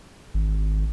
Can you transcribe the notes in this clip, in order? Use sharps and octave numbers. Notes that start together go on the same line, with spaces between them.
G#1